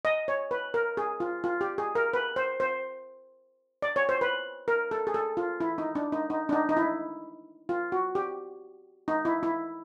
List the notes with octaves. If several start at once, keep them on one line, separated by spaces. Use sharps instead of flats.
D#5
C#5
B4
A#4
G#4
F4
F4
G4
G#4
A#4
B4
C5
C5
D5
C#5
C5
B4
A#4
A4
G#4
A4
F4
E4
D#4
D4
D#4
D#4
D4
D#4
D#4
E4
F4
F#4
G4
D#4
E4
E4